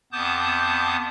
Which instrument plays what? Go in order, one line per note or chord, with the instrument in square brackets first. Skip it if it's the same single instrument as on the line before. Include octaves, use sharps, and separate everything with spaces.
[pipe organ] F2 B3 A5 D6 D#6 G6